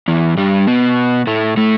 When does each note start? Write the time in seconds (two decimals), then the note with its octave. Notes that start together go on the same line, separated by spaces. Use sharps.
0.08 E2 E3
0.37 G2 G3
0.67 B2 B3
1.27 A2 A3
1.57 A2 A3